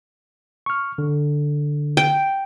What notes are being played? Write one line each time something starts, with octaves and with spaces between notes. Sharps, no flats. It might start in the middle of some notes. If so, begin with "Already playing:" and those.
C#6 F6
D3
G5